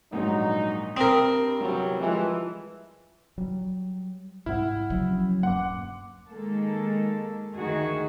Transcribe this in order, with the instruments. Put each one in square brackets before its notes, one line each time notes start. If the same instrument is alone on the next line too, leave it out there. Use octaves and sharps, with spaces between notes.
[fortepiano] A#1 G#2 [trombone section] F#3 D#4
[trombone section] G2 [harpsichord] C4 A#4 [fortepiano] D#6
[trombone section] E2 C3 F#3 [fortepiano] G3
[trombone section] E3 [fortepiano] F3 G#3
[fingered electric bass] F#3 G3
[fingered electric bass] C2 G#2 G3 [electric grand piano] E4 [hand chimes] F#5 F6
[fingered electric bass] C#3 F3 [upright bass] F#3
[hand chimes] C#4
[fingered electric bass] D#1 G2 A#3 [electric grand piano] F#5 [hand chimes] C6 D6
[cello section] D#3 G#3 A#3 A4
D2 D#3 A3 D#4 F#4 G#4